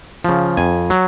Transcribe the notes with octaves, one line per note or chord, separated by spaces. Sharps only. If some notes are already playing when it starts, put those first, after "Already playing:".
C#3 F3
F2 G#5
F#3